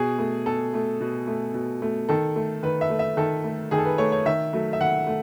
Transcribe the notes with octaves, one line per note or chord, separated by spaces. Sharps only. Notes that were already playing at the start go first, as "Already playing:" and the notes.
Already playing: B2 G#4
A3
B2 A4
A3
B2
A3
B2
A3
D#3 A4
A3
D#3 B4
E5
A3
E5
D#3 A4
A3
D#3 G#4
A4
B4
A3 C#5
C#5
D#3 E5
F#3 A3
E5
D#3 F#5
A3